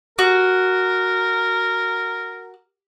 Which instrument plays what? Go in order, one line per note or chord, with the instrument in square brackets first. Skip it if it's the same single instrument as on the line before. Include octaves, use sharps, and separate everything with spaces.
[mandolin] F#4 [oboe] A#4